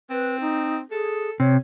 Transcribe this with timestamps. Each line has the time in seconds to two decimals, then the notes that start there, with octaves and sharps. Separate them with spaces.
0.10 C4 B4
0.41 D#4
0.91 G#4 A4
1.40 C3 C#5